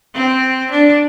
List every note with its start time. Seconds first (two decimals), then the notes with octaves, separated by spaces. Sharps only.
0.14 C4
0.72 D4